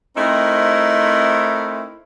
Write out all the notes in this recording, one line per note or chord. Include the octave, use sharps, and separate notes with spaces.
A3 C4 D#4 E4 A#4 C5